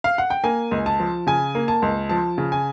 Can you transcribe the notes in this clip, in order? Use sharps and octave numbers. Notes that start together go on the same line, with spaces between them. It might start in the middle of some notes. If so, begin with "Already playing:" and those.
F5
F#5
G5
A#3 G#5
C#2
A5
F3
C#3 G#5
A#3
A5
C#2
F3 A5
C#3
G#5